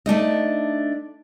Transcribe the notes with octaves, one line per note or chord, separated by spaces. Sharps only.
A3 D4 D#4 D#5